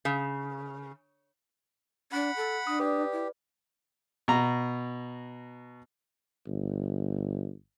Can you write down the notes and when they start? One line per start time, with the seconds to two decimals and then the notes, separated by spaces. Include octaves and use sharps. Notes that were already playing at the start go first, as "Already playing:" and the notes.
0.05 C#3
2.12 D4 F#5 B5
2.37 A4
2.67 D4 D#6
2.80 G4 B4 D5
3.13 E4
4.28 B2 A#5
6.47 G1